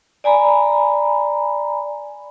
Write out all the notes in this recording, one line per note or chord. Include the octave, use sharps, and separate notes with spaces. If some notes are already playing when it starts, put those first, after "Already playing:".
D5 G#5 A#5 B5